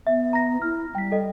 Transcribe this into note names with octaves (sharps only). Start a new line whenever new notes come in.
B3 E5
A#5 A#6
E4 F6
G3 G5 B6
A4 D#5 G5